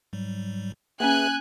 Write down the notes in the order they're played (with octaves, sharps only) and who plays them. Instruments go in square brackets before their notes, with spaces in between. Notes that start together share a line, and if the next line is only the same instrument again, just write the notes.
[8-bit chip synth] G#2 F#3 G3
[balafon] A#3 C#4 [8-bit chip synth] G#4 B4 E5 [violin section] G#5 F#6